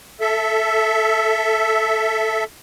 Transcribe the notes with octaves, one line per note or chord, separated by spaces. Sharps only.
A4 E5